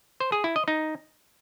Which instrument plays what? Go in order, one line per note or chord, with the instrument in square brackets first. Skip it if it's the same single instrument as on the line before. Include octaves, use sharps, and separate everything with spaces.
[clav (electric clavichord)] C5
G#4
E4
D#5
D#4